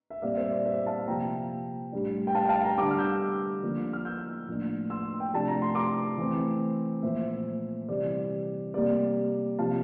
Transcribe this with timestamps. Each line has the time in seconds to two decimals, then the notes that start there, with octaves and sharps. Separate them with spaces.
0.10 E5
0.22 A#2 G3 C4 D5 F5
0.37 C5 E5
0.51 D5
0.66 C5 E5
0.86 F5 A5
1.07 C3 F3 A#3 G5 A#5
1.92 A2 G3 D4
2.27 G5
2.35 F5 A5
2.45 G5
2.49 F5 A5
2.63 G5 A#5
2.77 D3 G3 D4 A#5 D6
2.91 F6
2.98 E6 G6
3.63 D3 F3 A#3 D4
3.93 F6
4.05 E6 G6
4.47 A2 F3 A#3 D4
4.90 C6 E6
5.20 G5
5.33 C3 F3 A3 D4 A5
5.48 A#5
5.62 C6
5.75 A#5 D6
6.18 E3 A3 C4
7.03 A#2 F3 A3 C5 E5
7.88 C3 E3 G3 C4 D5
8.74 C3 G3 A#3 D5
9.58 C3 F3 A#3 F5 A5